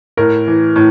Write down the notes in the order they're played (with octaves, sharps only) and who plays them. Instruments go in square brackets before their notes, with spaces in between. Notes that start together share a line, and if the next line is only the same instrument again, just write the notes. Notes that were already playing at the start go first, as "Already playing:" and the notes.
[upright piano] A2 A#4
E3
A2